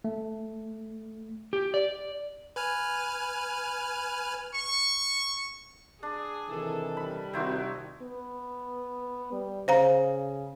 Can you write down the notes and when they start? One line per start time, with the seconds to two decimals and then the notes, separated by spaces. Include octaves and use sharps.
0.04 A3
1.53 G4
1.74 D5
2.56 B4 G#5 F6
4.54 C#6
6.03 D4 G#4
6.50 C3 D#3 E3 A4
6.97 G3 B5
7.34 C3 D#3 C4 D#4 E4 F#4
8.02 B3
9.33 G3
9.68 C#3 C5 F5 A#5